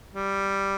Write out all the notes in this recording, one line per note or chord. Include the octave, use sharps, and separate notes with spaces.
G3